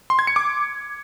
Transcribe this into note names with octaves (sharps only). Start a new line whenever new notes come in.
C6
G#6
C#7
D6